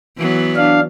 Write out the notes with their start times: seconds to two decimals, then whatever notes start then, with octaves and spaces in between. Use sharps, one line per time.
0.17 E3 F#3 B3
0.56 D4 F5